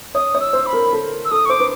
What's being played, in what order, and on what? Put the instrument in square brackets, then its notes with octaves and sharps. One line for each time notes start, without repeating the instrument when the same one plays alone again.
[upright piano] C#5 [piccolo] D#6
[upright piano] C#5
[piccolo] E6
[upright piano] C5
[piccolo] B5
[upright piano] A#4
A4
[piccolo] E6
[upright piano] A4 [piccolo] D#6
[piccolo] C#6
[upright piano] C5 [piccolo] D6
[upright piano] B4